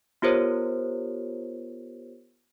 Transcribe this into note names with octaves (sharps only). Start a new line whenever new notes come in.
B3 F4 G4 A#4 C5 C#5